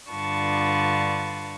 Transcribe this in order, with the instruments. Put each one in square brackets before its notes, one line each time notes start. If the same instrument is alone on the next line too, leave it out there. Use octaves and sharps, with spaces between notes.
[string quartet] G2 D3 F4 B4 A5 C#6